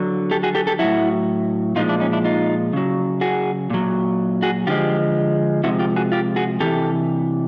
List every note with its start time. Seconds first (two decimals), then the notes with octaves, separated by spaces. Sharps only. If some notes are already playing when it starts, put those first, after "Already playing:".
Already playing: D3 F#3
0.31 G4 A4
0.43 F#4 G#4
0.55 G4 A4
0.67 G4 A4
0.79 A2 F#3 E4 F#4
1.76 A#2 F3 G#3 D#4 F4
1.88 D4 E4
2.00 C#4 D#4
2.12 D4 E4
2.25 D#4 F4
2.73 C#3 F#3
3.21 F#4 G#4
3.70 A#2 F#3
4.42 F#4 G#4
4.67 D3 F3 G#3 F4 G4
5.64 C3 F3 G#3 E4 F#4
5.79 F4 G4
5.96 F#4 G#4
6.12 F4 G4
6.36 F#4 G#4
6.60 C3 E3 G4 A4